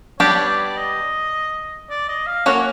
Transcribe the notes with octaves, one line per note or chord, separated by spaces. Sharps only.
G3 B3 D4 G4 C#5
D5
D#5
D5
D#5
F5
A#3 C#4 F#4 A#4 C#5 F#5